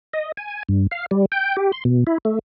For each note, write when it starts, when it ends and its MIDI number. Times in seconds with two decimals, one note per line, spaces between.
0.13 0.32 75
0.37 0.63 80
0.69 0.87 43
0.91 1.06 77
1.11 1.25 55
1.32 1.56 79
1.57 1.72 67
1.72 1.84 84
1.85 2.04 47
2.07 2.18 64
2.25 2.39 57